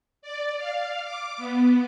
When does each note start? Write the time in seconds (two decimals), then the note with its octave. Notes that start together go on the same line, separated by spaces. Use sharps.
0.22 D5
0.57 F5
1.03 D6
1.37 B3